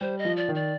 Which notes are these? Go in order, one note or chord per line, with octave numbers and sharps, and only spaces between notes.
G3 C5
D#5
F3
D5
D#3
D5